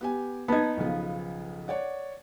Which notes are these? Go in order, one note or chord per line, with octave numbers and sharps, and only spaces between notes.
B3 G4 G#5
B3 D#4 A5 G#6
B1 C#3 F3
C#5 D5 F#5